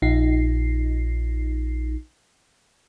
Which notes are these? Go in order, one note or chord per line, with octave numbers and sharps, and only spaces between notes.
A#1 D#4 C7